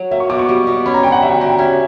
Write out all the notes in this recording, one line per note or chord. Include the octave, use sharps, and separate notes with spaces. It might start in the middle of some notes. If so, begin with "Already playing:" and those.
Already playing: F#3 F#4
A#3 E5
C#6
B2 D6
C#6
G3
B2
C#4 B5
A#5
D3 G5
F#5
G3 E5
F#5
G4 A#5
G5
C#4 E5